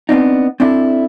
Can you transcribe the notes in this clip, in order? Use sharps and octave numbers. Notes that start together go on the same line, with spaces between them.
B3 C4 D4 D#4
C4 D4 E4 A4